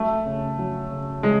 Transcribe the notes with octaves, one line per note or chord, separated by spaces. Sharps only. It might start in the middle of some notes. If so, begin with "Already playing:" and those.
Already playing: F#3 A3
C#3
F#3
C#3
C#3 G#3